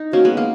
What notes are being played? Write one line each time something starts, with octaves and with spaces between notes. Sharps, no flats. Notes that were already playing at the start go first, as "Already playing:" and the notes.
Already playing: D#4
A#3 C#4 F#4
G#3 B3
A#3